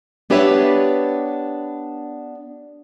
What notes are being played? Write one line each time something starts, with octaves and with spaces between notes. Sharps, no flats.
B3 D4 G4 B4 C#5 E5